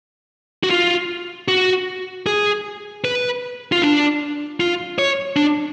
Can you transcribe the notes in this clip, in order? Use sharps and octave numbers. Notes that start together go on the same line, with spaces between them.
F#4
F4
F#4
G#4
B4
F4
D4
F4
C#5
D4